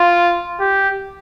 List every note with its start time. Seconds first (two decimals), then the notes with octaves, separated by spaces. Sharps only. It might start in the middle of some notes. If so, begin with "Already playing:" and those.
Already playing: F4
0.60 G4